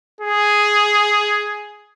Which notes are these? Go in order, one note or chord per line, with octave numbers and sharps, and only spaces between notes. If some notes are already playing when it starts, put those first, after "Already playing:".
G#4